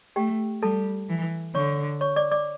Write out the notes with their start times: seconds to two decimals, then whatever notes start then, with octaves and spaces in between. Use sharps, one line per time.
0.16 A3 G4 G5
0.62 G3 A4 A5
1.09 E3
1.55 D3 C#5 C#6
2.01 C#5 C#6
2.16 D5 D6
2.31 D5 D6